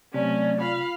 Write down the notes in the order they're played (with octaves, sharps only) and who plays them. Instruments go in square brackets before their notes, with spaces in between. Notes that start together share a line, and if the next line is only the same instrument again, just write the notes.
[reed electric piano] C3 [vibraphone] F#3 A3 C4 [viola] C#4 [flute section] D5
[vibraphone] F4 [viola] F5 B5